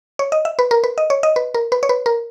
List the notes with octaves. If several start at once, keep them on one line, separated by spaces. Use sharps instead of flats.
C#5
D#5
E5
B4
A#4
B4
D#5
C#5
D#5
B4
A#4
B4
C#5
B4
A#4